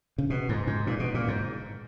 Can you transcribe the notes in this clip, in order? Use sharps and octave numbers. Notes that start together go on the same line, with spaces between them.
C#3
B2
G#2
G#2
A#2
B2
A#2
G#2